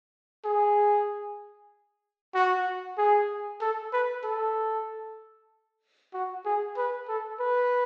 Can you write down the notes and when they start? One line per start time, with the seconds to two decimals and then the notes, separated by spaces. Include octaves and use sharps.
0.45 G#4
2.35 F#4
2.98 G#4
3.61 A4
3.93 B4
4.24 A4
6.14 F#4
6.45 G#4
6.77 B4
7.08 A4
7.40 B4